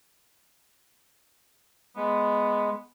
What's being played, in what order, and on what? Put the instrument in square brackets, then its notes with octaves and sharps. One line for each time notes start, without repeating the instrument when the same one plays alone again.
[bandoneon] G#3 [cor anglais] B3